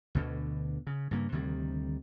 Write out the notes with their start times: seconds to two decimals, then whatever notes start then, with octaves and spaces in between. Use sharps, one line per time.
0.15 D2 B2 D3
0.87 C#3
1.11 G2 C#3 A#3
1.32 D2 C3 D#3 G3